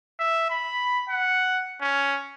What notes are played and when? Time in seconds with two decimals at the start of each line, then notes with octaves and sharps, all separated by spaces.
0.19 E5
0.50 B5
1.09 F#5
1.81 C#4